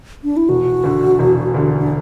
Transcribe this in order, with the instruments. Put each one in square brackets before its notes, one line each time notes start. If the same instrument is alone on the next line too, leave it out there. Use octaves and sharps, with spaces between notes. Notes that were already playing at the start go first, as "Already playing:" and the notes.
[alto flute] D4
E4
[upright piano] E1 [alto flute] F#4
[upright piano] D2 D3
E1
D2 D3
[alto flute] D4